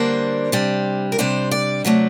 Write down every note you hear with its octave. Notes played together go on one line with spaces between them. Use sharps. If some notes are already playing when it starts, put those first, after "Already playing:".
Already playing: D3 G3 A#3 D4 C5
C3 G3 D4
A#4
C3 G3 D4 C5
D5
C3 F#3 A3 D4